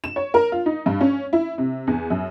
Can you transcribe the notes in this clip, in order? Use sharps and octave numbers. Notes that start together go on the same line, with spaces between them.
E7
C#5
A#4
F4
D#4
G2
C#4
E4
C3
E2
F#2